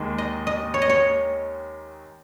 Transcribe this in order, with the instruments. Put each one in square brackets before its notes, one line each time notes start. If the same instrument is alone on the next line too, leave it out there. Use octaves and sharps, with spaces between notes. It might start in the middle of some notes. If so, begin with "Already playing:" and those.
Already playing: [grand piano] D#2 D#3 G#3
[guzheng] D#5
D#5
C#5
D#5
C#5